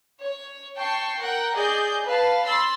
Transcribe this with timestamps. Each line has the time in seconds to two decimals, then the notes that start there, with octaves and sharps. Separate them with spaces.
0.20 C#5
0.76 G5 A5 C#6 C7
1.20 A#4 F#5 G5
1.54 G#4 D5 D#5 G6
2.04 B4 F5 A5
2.44 B5 C6 E6 A6